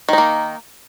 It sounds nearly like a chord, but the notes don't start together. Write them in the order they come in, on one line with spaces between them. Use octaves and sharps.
D#3 D#4 A#3